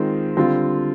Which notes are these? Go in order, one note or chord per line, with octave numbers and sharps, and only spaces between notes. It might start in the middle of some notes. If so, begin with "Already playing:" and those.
Already playing: D#3 G#3 C4 F4
D3 G3 C4 F4